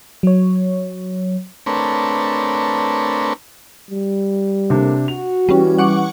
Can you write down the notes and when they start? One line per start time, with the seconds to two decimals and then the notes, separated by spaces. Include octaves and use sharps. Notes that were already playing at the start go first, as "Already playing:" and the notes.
0.23 F#3 C#5
1.66 A3 C4 D4 A#4 B4 C#5
3.91 G3
4.70 A2 C3 A#3 D4
5.08 F#4 F7
5.49 E3 G3 C#4
5.78 F#5 C#6 D6